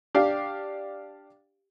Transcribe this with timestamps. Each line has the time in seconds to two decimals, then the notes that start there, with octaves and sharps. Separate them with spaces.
0.14 D4 G4 F5